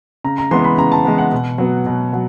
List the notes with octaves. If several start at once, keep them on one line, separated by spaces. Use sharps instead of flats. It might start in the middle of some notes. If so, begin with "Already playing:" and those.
C#3 A#5
A#5
E3 G#3 B3 C6
B5
C#3 A#5
A5
E3 G#3 B3
F#5
B2
F#3 B3
B2
F#3